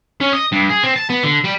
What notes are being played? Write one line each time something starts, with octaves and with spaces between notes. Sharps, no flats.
C#4
D#5
G2
G#4
C4
A5
B3
D3
G3